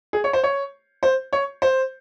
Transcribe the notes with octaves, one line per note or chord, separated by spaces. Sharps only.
G#4
C#5
C5
C#5
C5
C#5
C5